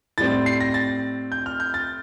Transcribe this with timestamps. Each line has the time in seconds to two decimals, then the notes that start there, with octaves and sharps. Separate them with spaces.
0.18 A2 G3 C4 A6
0.46 C7
0.60 A#6
0.74 A6
1.32 G6
1.46 F6
1.60 G6
1.74 A6